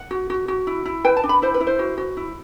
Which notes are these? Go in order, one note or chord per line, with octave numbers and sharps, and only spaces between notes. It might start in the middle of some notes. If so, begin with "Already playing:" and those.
Already playing: F#5
F#4
F#4
F#4
E4
E4
B4 G5
A5
D4
B5
E4 C5
B4
E4
C5
F#4
F#4
E4